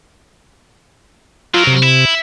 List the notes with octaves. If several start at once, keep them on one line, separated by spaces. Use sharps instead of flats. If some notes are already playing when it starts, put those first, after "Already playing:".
F#3 F4 A#4
C3
E4